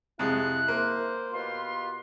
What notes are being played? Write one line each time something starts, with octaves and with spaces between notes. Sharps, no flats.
F2 C3 G#3 E4 F#6
A#3 C5
B2 F4 G4 B4 C6